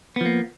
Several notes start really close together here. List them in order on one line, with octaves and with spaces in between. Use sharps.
B3 F3 A#3